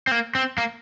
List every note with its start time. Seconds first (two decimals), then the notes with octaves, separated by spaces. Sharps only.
0.07 C4
0.11 A#3
0.35 C4
0.58 A#3